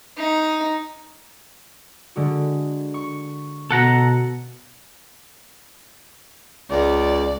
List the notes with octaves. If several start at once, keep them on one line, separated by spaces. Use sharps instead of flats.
D#4
D3 G#3 F#4
C#6
B2 A4 F#5 A#5
C#2 D5